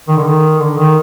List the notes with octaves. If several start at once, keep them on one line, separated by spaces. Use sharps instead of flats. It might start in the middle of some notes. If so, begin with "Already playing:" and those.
D#3
D3
D#3
D3
D#3